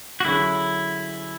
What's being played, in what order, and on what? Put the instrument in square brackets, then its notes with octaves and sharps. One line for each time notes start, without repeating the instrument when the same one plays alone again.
[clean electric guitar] F#4
[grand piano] D3 F#3 C#4 G#4 [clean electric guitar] E4